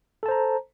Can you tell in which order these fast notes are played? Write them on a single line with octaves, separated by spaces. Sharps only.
A4 A5 C5 A#5